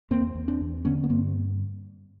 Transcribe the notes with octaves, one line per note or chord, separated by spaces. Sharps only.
E2 A#3 C4
E2
C4 D4
E2
D3 B3 C#4
B3
G2 A#3 C4